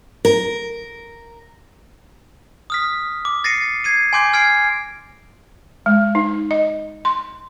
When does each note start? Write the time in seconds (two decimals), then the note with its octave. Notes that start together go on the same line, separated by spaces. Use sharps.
0.25 A#4
2.70 D#6 F6 B6
3.25 D6
3.44 A6 A#6 C7 C#7 D#7
3.84 G#6 C7 D#7
4.13 G#5 C6 D6 G6
4.33 F6 G#6 C7 D7
5.86 G#3
6.15 D#4
6.51 D#5
7.05 C6